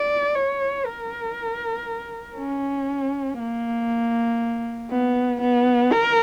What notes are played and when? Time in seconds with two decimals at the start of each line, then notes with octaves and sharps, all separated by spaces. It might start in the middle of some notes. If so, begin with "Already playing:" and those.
Already playing: D5
0.35 C#5
0.86 A#4
2.37 C#4
3.39 A#3
4.91 B3
5.41 B3
5.92 A#4